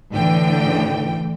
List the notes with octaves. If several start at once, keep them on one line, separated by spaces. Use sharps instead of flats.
D2 A2 D3 E3 G5